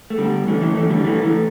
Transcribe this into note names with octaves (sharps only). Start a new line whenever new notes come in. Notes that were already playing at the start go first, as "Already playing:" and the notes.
A3
D3 G3
E3 A3
E3 A3
E3 A3
D3 G3
E3 A3
E3 A3